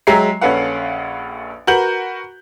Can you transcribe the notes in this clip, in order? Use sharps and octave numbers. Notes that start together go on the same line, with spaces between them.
F#3 G#3 E5 G5 A#5 C7
A#1 C#4 A4 B4 F5 F#5
F#4 A#4 B4 G6 F#7